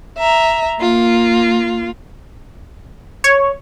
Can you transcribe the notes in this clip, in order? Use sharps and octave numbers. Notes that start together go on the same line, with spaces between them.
E5 A#5
A#3 F4
C#5